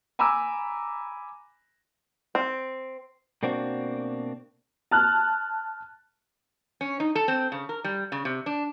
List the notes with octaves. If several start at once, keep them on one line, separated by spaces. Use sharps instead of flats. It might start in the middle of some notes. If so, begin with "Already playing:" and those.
G#5 A#5 B5 D6 E6
C4
B2 A#3 C4 D4 F#4
A5 F6 F#6
C#4
D#4
A4
C4
C#3
A#4
G3
C#3
C3
D4